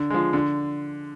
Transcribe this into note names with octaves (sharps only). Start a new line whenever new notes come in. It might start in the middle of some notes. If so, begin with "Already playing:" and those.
Already playing: D3
F3 G#3
D3